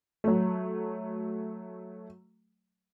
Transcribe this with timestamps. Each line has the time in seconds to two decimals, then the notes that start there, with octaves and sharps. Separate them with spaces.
0.24 F#3 A3